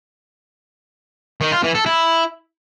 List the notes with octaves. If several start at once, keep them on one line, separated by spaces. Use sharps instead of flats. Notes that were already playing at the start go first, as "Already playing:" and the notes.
D#3
F4
E3
A4
E4